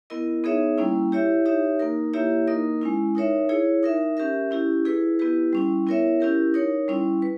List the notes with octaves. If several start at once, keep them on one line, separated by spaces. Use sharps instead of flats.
B3 E4 A#4 D#5
B3 D#4 G#4 C#5 E5
G3 A#3 C#4 E4
E4 G4 C#5 E5
D#4 G4 C#5 E5
A#3 D#4 A#4
A#3 E4 G4 C#5 E5
A#3 D#4 A#4 D#5
G#3 C#4 E4
D#4 A#4 C#5 E5
E4 G#4 C#5
D#4 A#4 E5
C#4 G4 A#4 E5
C#4 E4 G4
E4 G#4 B4
B3 E4 G4 B4
G3 C#4 E4
B3 E4 A#4 C#5 E5
C#4 E4 G4 A#4
D#4 A#4 C#5
G3 C#4 E4
B4